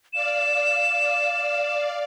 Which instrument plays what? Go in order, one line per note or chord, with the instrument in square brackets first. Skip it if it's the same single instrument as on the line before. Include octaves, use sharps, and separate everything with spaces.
[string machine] D5 F5 [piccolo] E7